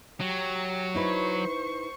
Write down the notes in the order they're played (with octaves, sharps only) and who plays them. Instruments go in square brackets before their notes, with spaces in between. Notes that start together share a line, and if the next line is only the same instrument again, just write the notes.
[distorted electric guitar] F#3 [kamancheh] G4 A#5
[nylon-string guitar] D#4 E4 B4 [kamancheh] C5 C#6